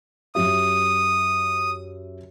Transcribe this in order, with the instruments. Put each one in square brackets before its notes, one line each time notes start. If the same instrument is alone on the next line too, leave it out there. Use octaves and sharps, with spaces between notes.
[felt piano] F#2 G4 E5 [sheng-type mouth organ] D#6